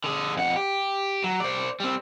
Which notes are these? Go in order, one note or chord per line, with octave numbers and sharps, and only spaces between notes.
D3 G#4
F2 F#5
G4
F#3
C5 D5
G3 C4